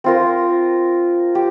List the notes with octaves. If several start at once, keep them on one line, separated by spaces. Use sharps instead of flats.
C4 F4 A#4
G4